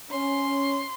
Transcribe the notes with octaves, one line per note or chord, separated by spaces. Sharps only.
C#4 C6